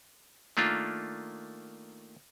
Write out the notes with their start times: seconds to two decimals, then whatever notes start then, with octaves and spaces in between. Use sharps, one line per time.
0.57 D#3 A3 A#3 D4 F4